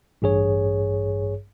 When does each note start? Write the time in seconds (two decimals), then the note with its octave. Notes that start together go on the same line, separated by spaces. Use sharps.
0.22 A1 G2 G#4 C#5